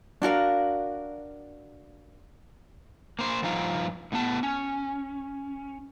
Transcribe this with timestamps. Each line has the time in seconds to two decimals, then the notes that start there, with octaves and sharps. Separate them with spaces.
0.22 D4 F#4 A#4 F5
3.19 A#3 C5
3.42 G2 F3 D#4 F4 F5
4.12 A2 B3 A5
4.43 C#4